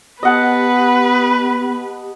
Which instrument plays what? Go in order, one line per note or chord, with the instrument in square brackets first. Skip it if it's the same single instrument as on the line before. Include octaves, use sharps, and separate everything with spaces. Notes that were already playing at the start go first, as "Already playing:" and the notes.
[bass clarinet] B3 [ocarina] G4 [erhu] B4 [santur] D#5 F#5 A5